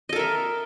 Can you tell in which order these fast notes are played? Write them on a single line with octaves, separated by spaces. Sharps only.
D#5 A4 A#4 E5